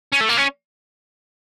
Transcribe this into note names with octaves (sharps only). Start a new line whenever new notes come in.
C#4
A3
A#3
C#4